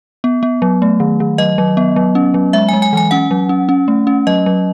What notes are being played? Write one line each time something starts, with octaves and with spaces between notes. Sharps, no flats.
B3
B3
F#3
A3
D#3
D#3
F#3 D#5
F#3
B3
F#3
C#4
F#3
G#3 E5
G#3 G#5
G#5
E3 G#5
C#4 F#5
F#3
C#4
C#4
A3
C#4
F#3 D#5
F#3